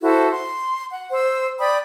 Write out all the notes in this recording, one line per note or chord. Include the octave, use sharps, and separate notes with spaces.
E4 F#4 A4 C5
C6
F#5
C5 E6
D5 G5 B5 D#6